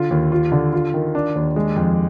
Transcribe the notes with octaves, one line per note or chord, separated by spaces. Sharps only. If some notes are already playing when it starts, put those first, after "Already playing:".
Already playing: D3 F4
D#2
F4
D3
F4
D#3
D4
D#2
G#3
F2